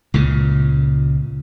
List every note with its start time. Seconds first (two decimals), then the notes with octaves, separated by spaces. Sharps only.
0.14 C#2 A#2 C#3